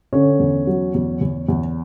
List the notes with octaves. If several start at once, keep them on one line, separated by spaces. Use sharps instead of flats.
D3 C#4
E2
F#3
E2
E2
E2